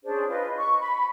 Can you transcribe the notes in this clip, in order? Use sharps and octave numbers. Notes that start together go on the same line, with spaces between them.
C#4 D4 G#4 C5
F4 B4 D#5
C#6
B5